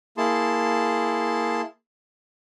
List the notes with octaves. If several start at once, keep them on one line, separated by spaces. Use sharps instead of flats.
A#3 E4 G#4 A5 C6